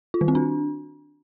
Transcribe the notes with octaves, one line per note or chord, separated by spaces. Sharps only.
F4
D#3
C4
D4